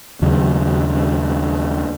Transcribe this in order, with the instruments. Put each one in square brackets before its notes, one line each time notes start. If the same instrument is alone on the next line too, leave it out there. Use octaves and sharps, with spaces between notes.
[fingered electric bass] D#2 C#3 F#3